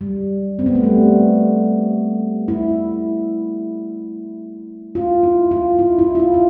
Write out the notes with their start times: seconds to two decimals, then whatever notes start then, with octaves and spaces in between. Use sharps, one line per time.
0.01 G3
0.59 C4
0.66 B3
0.75 A3
0.83 G3
2.48 E4
4.95 F4
5.23 E4
5.51 F4
5.79 E4
5.99 E4
6.15 F4
6.20 E4
6.34 F4